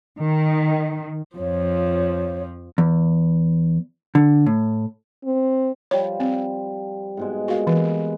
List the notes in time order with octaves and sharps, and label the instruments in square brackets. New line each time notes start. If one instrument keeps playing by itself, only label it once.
[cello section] D#3
[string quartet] F2 F3 [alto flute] C#5
[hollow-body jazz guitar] E2
D3
A2
[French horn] C4
[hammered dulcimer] F3 G3 [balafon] C#5
[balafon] C4
[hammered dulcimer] G#2 B2 G#3
[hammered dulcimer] A#2 G#3 [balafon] F#4 F5
[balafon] E3 [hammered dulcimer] B3 B4